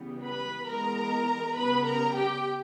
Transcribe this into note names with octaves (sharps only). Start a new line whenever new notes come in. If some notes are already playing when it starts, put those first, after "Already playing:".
Already playing: C#3 E3 G3 B3
B4 B5
E3 G#3 B3 A#4 A#5
C#3 G3 B3 B4 B5
A#4 A#5
G4 G5